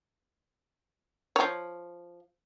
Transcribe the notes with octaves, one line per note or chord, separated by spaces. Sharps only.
F3 C#5